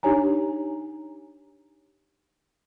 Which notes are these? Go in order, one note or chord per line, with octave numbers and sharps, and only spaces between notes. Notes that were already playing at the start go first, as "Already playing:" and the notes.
D4 D#4 G4 C#5 G#5 A#5